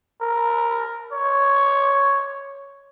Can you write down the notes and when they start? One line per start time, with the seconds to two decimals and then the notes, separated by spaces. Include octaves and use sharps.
0.21 A#4
1.12 C#5